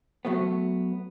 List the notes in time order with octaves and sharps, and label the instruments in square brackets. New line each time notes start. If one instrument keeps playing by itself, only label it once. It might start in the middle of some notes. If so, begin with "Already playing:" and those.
[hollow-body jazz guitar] F#3 A3 B3